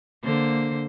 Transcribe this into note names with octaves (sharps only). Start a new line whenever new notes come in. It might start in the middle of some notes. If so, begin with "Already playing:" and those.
D3 A#3 C5